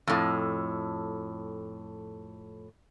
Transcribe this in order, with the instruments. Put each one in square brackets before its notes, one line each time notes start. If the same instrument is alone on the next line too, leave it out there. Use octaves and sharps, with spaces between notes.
[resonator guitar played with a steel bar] F2 A2